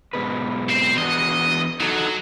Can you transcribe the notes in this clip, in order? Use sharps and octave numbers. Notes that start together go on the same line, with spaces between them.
G#2 B2 B4
C4 C5
E2 D4 F#4 D#5
F#3 D#4 F#4 A4